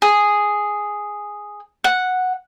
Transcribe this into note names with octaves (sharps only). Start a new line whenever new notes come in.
G#4
F#5